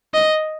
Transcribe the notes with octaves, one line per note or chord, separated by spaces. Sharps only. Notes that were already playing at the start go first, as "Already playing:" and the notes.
D#5